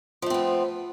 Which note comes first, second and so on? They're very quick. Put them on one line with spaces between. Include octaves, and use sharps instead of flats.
F3 A3 C4 B3